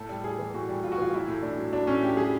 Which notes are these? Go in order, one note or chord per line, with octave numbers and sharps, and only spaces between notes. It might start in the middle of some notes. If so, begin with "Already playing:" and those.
Already playing: A2 A4
G3
A2 G#4
E3
A2 F#4
G3
A2 F4
F#4
E3 F4
F#3 E4
A2
A2 D4
F#3
F#3 D4
A2 C#4
A2 G4
F#3 G#4